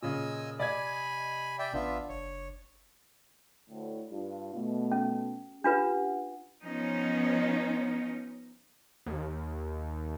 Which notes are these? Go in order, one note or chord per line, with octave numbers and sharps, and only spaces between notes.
A#2 C#3 D#5 G#5 E6
C3 D5 D#5 G#5 B5 G#6
D5 E5 G5
A1 B3 D4 F4 E5
F#1 C#5
D2 A2
G2 F4
B2 A3
C#4
D4 F4 G4 B4 F#5
F3 B3 C#4 D#4
D#2